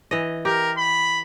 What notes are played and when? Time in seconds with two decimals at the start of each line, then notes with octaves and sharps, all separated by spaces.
0.11 E3 D#5
0.45 G4 A#4
0.78 B5